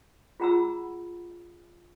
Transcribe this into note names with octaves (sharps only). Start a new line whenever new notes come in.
F4 G#4 F#5 A#5 B5 E6